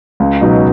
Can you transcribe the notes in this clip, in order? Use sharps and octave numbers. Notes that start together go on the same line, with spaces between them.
C#2
B2 F#3 D#4